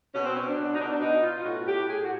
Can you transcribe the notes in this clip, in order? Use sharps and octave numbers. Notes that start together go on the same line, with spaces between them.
B2 C#4
C4
B2 C#4
D4
B2
D#4
B2 D4
D4
B2 D#4
B2 F4
F4
A2 F#4
A2 G4
A2 G#4
F#4